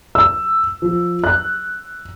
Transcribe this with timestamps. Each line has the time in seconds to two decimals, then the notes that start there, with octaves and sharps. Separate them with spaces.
0.15 E6
0.82 F3
1.24 F#6